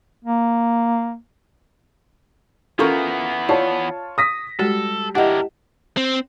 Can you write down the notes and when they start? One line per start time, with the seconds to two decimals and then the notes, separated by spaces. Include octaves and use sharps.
0.25 A#3
2.79 E3 B3 C#4 F4 A4 A#4 C#6
3.49 F4 C#5 D5 A5
4.18 D#6 A#6 B6
4.59 G3 G#3 F#4 A4
5.15 D4 E4 G4 A#4 D#5 F#5
5.97 C4